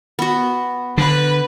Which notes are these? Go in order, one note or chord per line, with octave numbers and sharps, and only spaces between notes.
B3 F#4
D3 B4